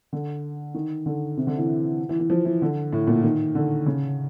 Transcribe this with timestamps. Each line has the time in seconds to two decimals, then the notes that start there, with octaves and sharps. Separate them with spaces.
0.13 D3
0.74 D#3
1.06 D3
1.37 C3
1.47 D3
1.58 E3
2.09 E3
2.20 E3
2.30 F3
2.45 E3
2.62 D3
2.93 A2
3.07 A#2
3.23 D#3
3.55 D3
3.86 C#3